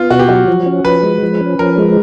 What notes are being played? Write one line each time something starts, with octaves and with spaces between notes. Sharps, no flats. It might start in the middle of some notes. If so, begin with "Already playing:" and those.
Already playing: B3 F4
B2 F#4
G4
F#3 F#4
F3
C#4
F3 B4
G#3
F3
C#4
F3 A#4
G#3